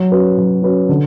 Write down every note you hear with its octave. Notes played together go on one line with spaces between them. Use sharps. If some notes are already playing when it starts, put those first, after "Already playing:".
Already playing: F#3
C#4 F#4 B4
F#3
C#4 F#4 B4
D3